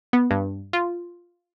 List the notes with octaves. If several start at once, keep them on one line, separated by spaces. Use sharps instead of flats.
B3
G2
F4